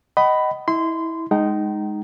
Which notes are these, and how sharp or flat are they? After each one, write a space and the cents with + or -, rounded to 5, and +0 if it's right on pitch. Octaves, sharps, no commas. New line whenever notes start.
D#5 +0 F#5 +40 B5 +10
E4 -20 C6 -20
G#3 +0 D#4 +0 G5 -40